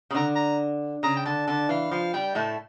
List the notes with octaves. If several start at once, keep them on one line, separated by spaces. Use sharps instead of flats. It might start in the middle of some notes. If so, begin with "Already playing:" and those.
C#3
D3 A#5
A#5
C#3 A#5
G5
D3 A5
D3 A5
E3 F5
F3 F5
G3 G5
A2 A3 A5